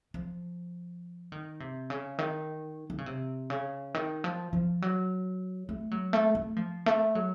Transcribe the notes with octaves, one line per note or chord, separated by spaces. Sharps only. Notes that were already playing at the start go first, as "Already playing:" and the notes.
F3
D#3
C3
C#3
D#3
D#3
C#3
C3
C#3
D#3
F3
F3
F#3
A3
F#3
A3
A3
F3
A3
F#3